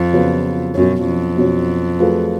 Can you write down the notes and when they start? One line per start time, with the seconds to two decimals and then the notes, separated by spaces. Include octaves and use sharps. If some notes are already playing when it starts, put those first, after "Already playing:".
Already playing: F2
0.13 C#3 F#3 B3 F4 B4
0.74 F#2 B2 F#3 C#4
1.06 F2
1.36 B2 F#3 C#4
1.99 F#3 A3 F4 G#4 B4